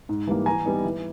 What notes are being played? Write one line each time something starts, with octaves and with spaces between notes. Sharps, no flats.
G#2
E3 G3 A#3
E3 G#5 A#5
G3 B3 D#4
E3